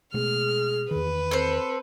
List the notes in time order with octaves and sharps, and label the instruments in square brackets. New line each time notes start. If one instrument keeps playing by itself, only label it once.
[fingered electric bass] B2 G#3 A3 [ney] G#4 [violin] F6
[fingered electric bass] E2 D#3 [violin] B4
[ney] C4 [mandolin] A4 C5